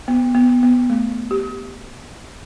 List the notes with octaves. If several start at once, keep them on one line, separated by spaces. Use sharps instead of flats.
B3
B3
B3
A3
G4